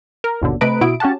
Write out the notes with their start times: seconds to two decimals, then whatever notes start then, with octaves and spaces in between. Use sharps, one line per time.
0.24 A#4
0.42 G1 D#2 B2 D3
0.61 C3 A3 B4 D#5 A#5 D7
0.81 B2 E4 F#4 D#6 D7
1.00 C#4 F#4 G4 F#5 A5